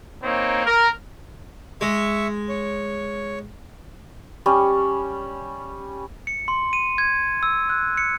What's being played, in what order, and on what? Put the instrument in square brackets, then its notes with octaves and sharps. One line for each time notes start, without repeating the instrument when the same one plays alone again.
[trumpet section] A#3 C4 D#4 C#5
A#4
[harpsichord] G#3 [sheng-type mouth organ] E5 C#6
[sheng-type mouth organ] C#5
[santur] G3 C#4
[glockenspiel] C#7
C6
D#7
G#6
E6
F#6
C#7